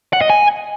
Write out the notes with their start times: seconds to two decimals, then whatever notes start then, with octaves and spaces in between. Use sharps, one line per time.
0.13 F#5
0.21 D#5
0.30 G#5